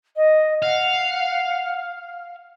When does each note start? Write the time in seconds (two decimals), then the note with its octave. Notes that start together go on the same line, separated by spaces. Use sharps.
0.16 D#5
0.63 F5 F#5